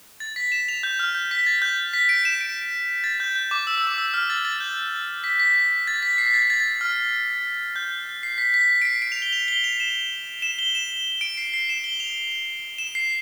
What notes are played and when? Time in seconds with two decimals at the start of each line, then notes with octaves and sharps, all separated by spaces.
0.20 A6
0.36 B6
0.52 E7
0.69 F7
0.83 G6
0.99 F6
1.15 G6
1.31 B6
1.46 A6
1.62 G6
1.94 B6
2.09 D7
2.25 E7
2.41 D7
3.04 A6
3.20 G6
3.35 G6
3.51 D6
3.67 E6
3.77 E6
3.87 D6
3.98 E6
4.14 F6
4.30 A6
4.45 A6
4.60 G6
5.24 B6
5.39 B6
5.87 A6
6.03 B6
6.18 C7
6.26 B6
6.34 A6
6.50 A6
6.60 A6
6.81 F6
7.76 G6
8.23 C7
8.38 B6
8.54 B6
8.82 D7
8.85 C7
9.02 D7
9.12 F7
9.22 G7
9.33 F7
9.48 G7
9.64 F7
9.80 E7
10.42 E7
10.59 G7
10.75 E7
11.21 D7
11.38 C7
11.54 C7
11.69 E7
11.84 G7
12.00 F7
12.78 E7
12.95 C7